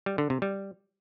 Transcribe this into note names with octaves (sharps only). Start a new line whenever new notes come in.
G3
D3
C3
G3